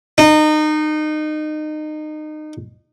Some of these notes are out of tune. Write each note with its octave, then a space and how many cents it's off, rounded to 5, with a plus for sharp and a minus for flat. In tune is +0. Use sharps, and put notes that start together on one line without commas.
D#4 -25